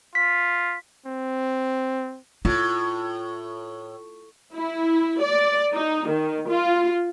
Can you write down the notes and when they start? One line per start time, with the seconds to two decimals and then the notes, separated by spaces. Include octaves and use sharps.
0.15 F4 B6
1.06 C4
2.45 A2 F4
4.54 E4
5.21 D5
5.73 D#4
6.07 D#3
6.48 F4